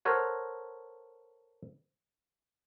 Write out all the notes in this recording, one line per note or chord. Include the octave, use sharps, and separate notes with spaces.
A4 A#4 C5 C#5 F#5